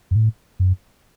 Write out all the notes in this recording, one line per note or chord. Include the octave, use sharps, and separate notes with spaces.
F#2
A2
F#2